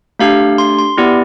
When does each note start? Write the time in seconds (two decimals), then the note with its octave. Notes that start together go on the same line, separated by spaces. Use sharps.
0.19 A3 D4 G4 F5
0.58 C6
0.79 C6
0.97 B3 E4 G4 D5